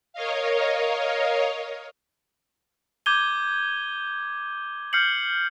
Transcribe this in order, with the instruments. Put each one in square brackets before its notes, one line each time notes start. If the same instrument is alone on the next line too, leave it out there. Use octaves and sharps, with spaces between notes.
[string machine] A#4 C#5 D#5 F5
[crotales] D6 G6 G#6 D#7 G7
F6 G6 C7 C#7 F#7